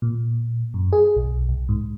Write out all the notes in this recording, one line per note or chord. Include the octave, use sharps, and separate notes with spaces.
A#2
F#2
G#4
B1
C2
G#2